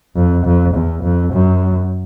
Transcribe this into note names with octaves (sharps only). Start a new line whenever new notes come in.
F2
F2
E2
F2
F#2